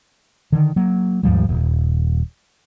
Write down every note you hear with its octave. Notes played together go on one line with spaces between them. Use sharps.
D3 D#3
F#3 A#3
D#2 G#2 F3 G3
D#1